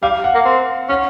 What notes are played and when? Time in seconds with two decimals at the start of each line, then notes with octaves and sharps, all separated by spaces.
0.03 G3 F5
0.24 F#5
0.35 A#3
0.45 C4
0.89 C#4 F#5